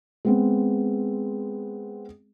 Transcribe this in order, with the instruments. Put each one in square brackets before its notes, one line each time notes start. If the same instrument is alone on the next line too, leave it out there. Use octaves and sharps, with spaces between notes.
[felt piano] G#3 B3 C4